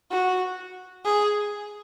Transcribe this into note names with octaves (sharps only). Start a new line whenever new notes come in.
F#4
G#4